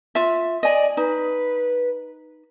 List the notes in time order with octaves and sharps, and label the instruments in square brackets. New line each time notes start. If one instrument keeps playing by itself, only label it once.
[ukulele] F4 E5
[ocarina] D5 [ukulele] D#5 G#5
[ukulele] D#4 [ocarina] B4